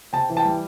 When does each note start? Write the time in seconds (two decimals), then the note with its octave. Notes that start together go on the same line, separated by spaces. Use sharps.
0.13 C3 G5 A5
0.30 E3
0.37 G5 A5
0.45 G3